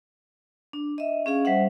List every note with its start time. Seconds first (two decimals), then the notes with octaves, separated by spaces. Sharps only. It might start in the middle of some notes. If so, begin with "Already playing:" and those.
0.73 D4
0.98 D#5 E5
1.26 C#4 G#4 F5
1.45 G3 C5 E5 F#5